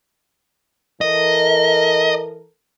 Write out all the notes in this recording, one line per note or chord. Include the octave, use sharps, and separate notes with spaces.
E3 A4 A#4 D#5